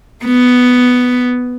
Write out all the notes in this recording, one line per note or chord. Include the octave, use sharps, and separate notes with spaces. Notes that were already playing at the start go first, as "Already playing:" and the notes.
B3